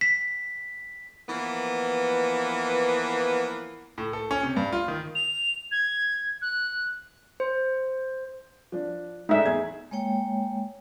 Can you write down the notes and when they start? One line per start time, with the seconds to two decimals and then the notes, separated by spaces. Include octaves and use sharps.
0.01 B6
1.29 E3 F3 A#3 B3
3.98 A2
4.13 A4
4.31 C#4
4.43 C3
4.56 G2
4.73 F4
4.88 D#3
5.15 F7
5.71 G#6
6.42 F#6
7.40 C5
8.72 F3 D4
9.29 A2 G#3 D4 D#4 E5
9.45 E2 G#4 G#6
9.91 G#3 A#3 C#5 G5